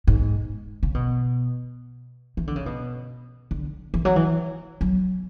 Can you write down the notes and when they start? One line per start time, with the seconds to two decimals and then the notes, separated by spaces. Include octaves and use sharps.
0.07 G#2
0.83 C#3
0.94 B2
2.37 E3
2.47 D3
2.56 C#3
2.66 B2
3.51 D3
3.94 E3
4.05 F#3
4.16 E3
4.81 F#3